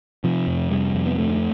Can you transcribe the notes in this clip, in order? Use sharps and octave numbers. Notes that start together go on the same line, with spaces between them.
C3 F3
F2
C3 G3
F2
B3
D2 A3